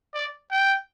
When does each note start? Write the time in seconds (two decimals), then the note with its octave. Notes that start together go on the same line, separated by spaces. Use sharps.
0.14 D5
0.51 G5